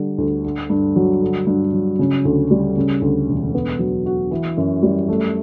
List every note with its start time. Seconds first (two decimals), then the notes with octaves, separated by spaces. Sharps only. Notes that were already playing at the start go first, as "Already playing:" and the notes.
Already playing: D3 G3
0.18 D2
0.44 D3
0.70 G2
0.96 F#3
1.21 D3
1.47 G2
1.73 F#3
1.99 C#3
2.25 D2
2.51 G3
2.77 C#3
3.02 D2
3.28 E1
3.54 B3
3.79 F#3
4.06 F#4
4.31 E3
4.57 F#2
4.83 G3
5.08 A3